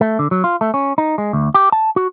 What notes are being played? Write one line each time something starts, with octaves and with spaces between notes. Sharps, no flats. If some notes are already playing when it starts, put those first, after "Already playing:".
A3
D3
F#3
F4
A3
C#4
D#4
G#3
D2
G4
A5
F#4